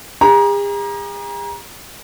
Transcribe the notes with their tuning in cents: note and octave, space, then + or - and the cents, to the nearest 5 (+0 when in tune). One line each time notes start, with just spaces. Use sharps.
G#4 -45 A#5 +25